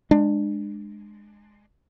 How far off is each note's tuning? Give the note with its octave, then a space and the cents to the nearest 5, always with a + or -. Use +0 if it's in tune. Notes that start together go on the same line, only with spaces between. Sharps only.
G#3 +0 D4 +25